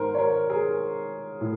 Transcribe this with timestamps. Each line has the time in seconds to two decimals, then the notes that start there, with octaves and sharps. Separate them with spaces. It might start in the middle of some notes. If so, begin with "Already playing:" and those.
Already playing: G#2 D#3 A#4 C5
0.15 C#5
0.19 A#4 C5
0.50 G#4 A#4
1.41 A2